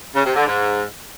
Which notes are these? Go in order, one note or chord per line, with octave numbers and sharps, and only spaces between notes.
C#3
C3
D3
G#2